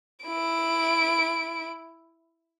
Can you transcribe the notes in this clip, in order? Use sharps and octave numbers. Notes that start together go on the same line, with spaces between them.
E4 D7